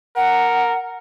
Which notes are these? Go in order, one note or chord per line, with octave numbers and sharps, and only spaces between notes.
A#4 F#5